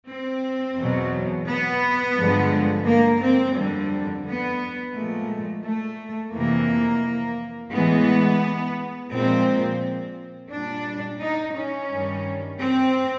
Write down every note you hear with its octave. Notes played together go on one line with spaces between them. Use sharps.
C4
E2 B2 F#3
B3
G2 D3 F3 G#3
A#3
C4
F2 D3 G3
B3
A#2 F3 G#3 A3
A3
F2 C3 E3 A#3
A2 E3 G#3 B3
A#2 F3 G#3 C4
A#2 G3 D4
D#4
C#4
G2 D#3 G3
C4